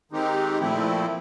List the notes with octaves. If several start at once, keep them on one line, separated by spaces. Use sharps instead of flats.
D#3 G#3 C4 D#4 G4
A#2 F3 A3 C4 E4